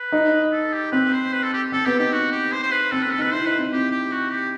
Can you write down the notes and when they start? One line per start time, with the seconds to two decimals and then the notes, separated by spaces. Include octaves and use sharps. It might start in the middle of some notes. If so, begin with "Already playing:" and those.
Already playing: B4
0.12 D#4
0.52 A4
0.73 G4
0.92 C4 B4
1.13 C5
1.33 B4
1.43 A4
1.53 G4
1.72 C4 A4
1.86 B3 G4
1.99 D#4 G4
2.13 F#4
2.32 G4
2.52 C5
2.63 C5
2.72 B4
2.91 C4 A4
3.03 C4 B4
3.12 A4
3.18 D#4 B4
3.33 E4 C5
3.46 D#4 B4
3.58 C4
3.72 C4 G4
3.91 G4
4.12 F#4
4.31 G4